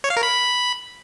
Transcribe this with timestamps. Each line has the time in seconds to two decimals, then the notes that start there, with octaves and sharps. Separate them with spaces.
0.04 C#5
0.10 F5
0.17 A#4
0.23 B5